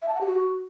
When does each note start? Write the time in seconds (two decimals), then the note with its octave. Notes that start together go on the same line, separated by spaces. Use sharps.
0.02 E5
0.08 A5
0.14 F#5
0.21 G4
0.27 F#4